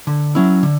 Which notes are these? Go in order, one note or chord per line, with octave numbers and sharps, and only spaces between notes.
D3
F#3 C#4 E4
D3